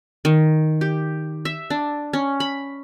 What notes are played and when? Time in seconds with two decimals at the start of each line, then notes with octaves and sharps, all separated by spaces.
0.25 D#3
0.81 G4
1.45 E5
1.70 D4
2.13 C#4
2.40 B5